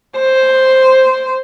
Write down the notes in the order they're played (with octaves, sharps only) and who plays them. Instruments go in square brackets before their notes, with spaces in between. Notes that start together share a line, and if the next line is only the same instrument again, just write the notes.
[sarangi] C5